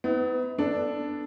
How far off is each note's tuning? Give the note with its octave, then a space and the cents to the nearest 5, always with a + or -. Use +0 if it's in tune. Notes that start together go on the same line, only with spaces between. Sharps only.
B3 +35 E4 -45
B3 +0 D4 +0 A4 +0